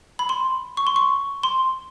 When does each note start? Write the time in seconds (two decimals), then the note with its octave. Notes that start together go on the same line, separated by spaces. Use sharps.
0.19 B5
0.29 C6
0.77 C#6
0.87 C6
0.96 C#6
1.43 C6